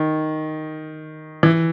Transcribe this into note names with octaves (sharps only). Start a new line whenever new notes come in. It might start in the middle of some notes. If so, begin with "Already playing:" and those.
Already playing: D#3
E3